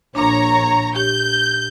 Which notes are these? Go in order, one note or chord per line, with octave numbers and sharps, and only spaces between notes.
A#1 A#2 D4 C#5 A#5
G4 G6